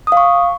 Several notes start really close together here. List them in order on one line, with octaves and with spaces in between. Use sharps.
D#6 F5 C#6